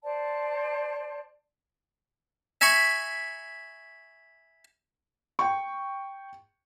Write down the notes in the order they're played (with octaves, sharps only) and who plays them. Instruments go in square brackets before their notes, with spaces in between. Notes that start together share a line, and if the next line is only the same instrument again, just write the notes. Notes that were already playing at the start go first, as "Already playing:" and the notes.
[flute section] C5 D5 A5
[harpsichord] E5 G#5 A#5 B5 C#6
[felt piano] G5 C#6